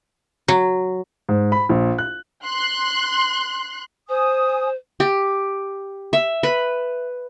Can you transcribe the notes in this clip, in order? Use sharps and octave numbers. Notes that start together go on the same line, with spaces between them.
F#3
G#2
B5
A#1
F#6
C6 F#6
C5 G#5 D#6
G4
E5
B4